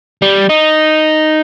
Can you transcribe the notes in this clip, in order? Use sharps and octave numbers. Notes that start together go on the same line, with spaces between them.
G3
D#4